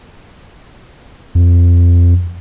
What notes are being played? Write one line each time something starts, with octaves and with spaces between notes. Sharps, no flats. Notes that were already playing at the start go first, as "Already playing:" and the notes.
F2